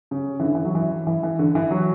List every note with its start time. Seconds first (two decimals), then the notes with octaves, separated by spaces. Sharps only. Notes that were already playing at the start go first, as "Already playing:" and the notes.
0.11 C#3
0.40 E3
0.43 D3
0.55 E3
0.65 F#3
0.75 E3
1.07 E3
1.23 E3
1.39 D3
1.55 E3
1.71 F#3